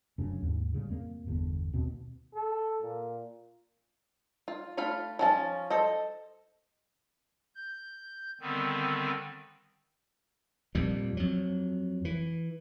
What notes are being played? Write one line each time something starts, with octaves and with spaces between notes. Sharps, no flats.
F1 F#2 C#3 D4
D#2 G#2
A2 C#3 G3
F2 A#3
G1 E2 D3
D#2 B2 C4
A4
A#2
F4
A3 F4 F5 B5
F3 C#4 A5
A4 C5 D#5
G6
D3 D#3 G3 B3 C4
F2 A#2 G3
F2 F#3
E3